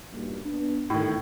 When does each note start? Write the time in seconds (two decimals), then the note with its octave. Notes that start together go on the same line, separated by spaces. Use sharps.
0.13 B1 G2 A#2
0.46 B3 D4
0.90 G1 A2 D#3